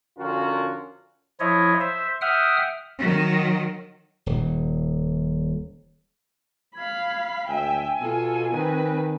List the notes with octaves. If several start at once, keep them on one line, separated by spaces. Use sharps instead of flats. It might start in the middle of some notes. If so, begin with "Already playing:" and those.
F2 D3 C#4 F4 F#4 A#4
F3 E4 C#5 D#5
C5 E5
E5 F#5 G5 D#6 F6
D#3 F#3
D#1
F5 B5 G#6
D2 E5 G5 G#5
B2 F4 A4
D#3 C4 B4